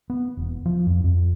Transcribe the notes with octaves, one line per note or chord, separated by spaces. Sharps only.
B3
E1
F3
F2
F2